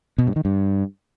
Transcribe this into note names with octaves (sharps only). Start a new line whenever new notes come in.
B2
G2
D#3
G2